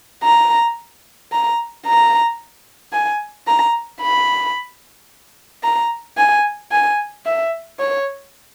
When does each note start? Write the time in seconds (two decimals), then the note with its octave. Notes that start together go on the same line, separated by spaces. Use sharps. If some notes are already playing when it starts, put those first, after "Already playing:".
0.23 A#5
1.32 A#5
1.86 A#5
2.93 G#5
3.47 A#5
4.01 B5
5.63 A#5
6.17 G#5
6.72 G#5
7.26 E5
7.79 C#5